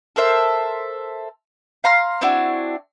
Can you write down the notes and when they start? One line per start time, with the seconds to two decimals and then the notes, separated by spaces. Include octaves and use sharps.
0.16 A4 A#4 C5 E5
1.84 F5 A#5 C6 F6
2.21 C4 D4 E4 F#4